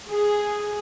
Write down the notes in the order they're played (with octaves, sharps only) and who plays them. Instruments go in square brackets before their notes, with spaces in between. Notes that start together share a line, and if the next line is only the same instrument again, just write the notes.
[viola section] G#4